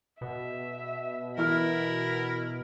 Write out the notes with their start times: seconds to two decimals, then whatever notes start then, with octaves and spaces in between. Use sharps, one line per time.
0.21 B2 E5
1.37 E3 E4 A#4 B5 F6